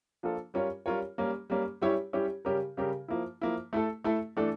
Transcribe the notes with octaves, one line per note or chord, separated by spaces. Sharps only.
F3 A#3 D4 F4 A4
G3 C#4 F4 A#4 C#5
G3 C#4 F4 A#4 C#5
G3 A#3 C#4
G3 A#3 C#4
G3 C#4 E4 G4 C#5
G3 C#4 E4 G4 C#5
C#3 G3 C#4 G4 A#4
C#3 G3 C#4 G4 A#4
F3 A#3 E4
F3 A#3 E4
A3 E4 A4
A3 E4 A4
E3 A3 D4 A4